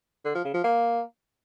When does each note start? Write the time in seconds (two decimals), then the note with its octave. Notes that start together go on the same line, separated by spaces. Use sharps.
0.25 D3
0.35 F3
0.44 C#3
0.54 F3
0.64 A#3